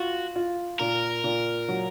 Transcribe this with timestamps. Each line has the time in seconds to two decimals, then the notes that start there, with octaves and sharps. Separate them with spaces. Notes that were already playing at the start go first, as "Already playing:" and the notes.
Already playing: F4 F#4
0.36 F4
0.79 A#2 A#4
1.24 A#2
1.68 F#3